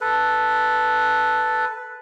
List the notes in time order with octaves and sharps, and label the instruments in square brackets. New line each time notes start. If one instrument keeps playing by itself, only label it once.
[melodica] A4 B4